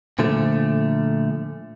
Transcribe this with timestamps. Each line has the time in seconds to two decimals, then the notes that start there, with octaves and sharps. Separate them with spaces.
0.19 A#2 D3 F3 A3